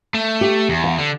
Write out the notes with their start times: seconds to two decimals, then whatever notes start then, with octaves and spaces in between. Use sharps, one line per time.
0.14 A3
0.41 G4
0.69 E2
0.84 F#5
0.99 D3